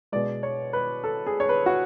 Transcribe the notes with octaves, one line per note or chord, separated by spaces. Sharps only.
B2 G#3 D5
C#5
B4
A4
G#4
C#5
B4
F#4